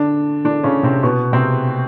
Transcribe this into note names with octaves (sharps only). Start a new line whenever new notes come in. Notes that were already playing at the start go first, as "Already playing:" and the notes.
Already playing: D3 D4
D3 D4
C#3 C#4
C3 C4
B2 B3
C3 C4